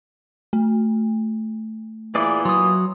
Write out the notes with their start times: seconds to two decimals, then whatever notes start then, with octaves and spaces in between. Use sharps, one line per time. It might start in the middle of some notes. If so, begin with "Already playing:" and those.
0.53 A3
2.15 A#2 E3 G#4 D5 D6
2.45 F#3 C6 D#6